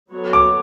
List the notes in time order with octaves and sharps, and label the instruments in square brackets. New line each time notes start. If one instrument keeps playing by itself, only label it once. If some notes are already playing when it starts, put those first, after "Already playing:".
[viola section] F#3 B3 F#4 A4 C#5
[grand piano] D6